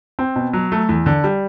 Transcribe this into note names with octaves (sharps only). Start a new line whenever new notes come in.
C4
B2
F#3
A3
E2
D3
G3